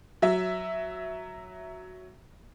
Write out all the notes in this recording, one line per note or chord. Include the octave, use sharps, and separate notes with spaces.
F#3 E5